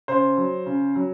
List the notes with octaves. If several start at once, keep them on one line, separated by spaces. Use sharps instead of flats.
C#3 C5
F#3
C#3
F#3